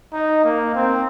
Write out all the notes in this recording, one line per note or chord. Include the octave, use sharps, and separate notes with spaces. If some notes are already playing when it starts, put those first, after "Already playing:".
D#4
A#3
C4